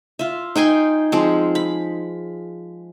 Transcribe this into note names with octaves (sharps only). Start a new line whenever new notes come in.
F4 E5
D#4 G5 G#5 C6
F3 G#3 C4
B5